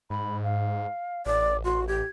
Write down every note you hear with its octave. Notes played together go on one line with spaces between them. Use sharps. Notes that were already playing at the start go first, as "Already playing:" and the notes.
G#2 B5
F5
A1 D5 D6
F#4 C6
G4 G#6